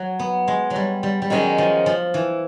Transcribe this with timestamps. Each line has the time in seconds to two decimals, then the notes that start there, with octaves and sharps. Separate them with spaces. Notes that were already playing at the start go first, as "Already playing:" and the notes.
Already playing: F#3
0.19 B3
0.48 G#3
0.70 F#3
0.76 G3
1.03 G3
1.22 G3
1.30 D#3 F#3 G#3 C#4
1.58 F3
1.86 F3
2.14 E3